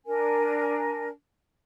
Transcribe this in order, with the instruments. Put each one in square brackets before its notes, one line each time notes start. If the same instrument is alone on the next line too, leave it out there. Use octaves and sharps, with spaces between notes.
[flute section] D4 A#4 G#5